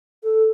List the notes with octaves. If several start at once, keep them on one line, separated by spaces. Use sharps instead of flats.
A4